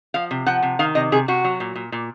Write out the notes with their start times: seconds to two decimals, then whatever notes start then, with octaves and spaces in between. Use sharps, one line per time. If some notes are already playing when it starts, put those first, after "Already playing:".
0.14 F3 F5
0.31 C3
0.46 F3 F#5
0.63 C3
0.79 D#3 F5
0.95 C3 D#5
1.12 C3 G#4
1.28 C3 F#4
1.44 F#3
1.60 A#2
1.75 A#2
1.92 A#2